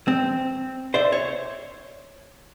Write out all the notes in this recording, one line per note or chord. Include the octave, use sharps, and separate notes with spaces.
C4
C5 D5 E5
C#5